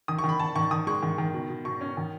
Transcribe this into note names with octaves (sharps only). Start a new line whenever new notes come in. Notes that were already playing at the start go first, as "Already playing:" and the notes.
D#3 D#6
C#6
D#3
B5
D#3 A5
D#3 C#6
D#3 D#6
G#3 C#6
D#3
D#3
B2
B2
B2 C#6
C#4
D#3